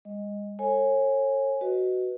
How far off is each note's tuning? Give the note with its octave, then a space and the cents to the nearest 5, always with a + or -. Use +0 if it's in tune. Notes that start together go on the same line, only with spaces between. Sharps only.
G#3 -35 D#5 +0
A4 +25 C#5 -30 G#5 +0
F#4 +10 B4 +0 D#5 +0